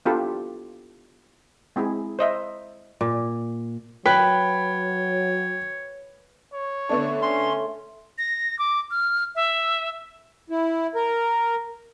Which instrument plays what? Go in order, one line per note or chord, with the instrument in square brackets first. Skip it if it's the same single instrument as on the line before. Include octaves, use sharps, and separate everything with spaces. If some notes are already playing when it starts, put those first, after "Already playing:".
[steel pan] B3 D4 E4 F4 G4 A4
G#3 C4 E4 G#4
C5 D#5 E5
[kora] A#2
[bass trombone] F#3 [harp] B4 [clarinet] C#5 [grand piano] G5
[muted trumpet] C#5
[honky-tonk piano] D3 B3 D4 [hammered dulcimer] A3
[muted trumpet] C#4 [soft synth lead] C6
[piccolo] A#6
D6
F6
E5
[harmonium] E4
A#4